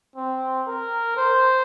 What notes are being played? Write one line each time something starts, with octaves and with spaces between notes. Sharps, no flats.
C4
A#4
C5